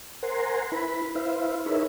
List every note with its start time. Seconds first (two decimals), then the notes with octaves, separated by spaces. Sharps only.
0.23 A#4 C5 F#5 G#5 A#5 C6
0.72 E4 B4 B5
1.15 E4 B4 C5 E5 F5
1.66 D#4 G#4 A#4 B4 C#5 E5